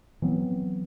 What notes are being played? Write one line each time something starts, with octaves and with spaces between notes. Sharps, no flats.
E3 F#3 B3 C4